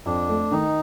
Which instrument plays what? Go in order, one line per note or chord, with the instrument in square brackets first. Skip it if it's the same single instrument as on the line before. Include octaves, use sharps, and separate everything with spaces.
[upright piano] F2 [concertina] D4
[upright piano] A3
[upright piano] D#3 [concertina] D#4